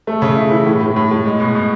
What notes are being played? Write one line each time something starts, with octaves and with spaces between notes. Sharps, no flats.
A3
C#3
E4
E3
A2
A2
A2
A2
G#3
B2
B2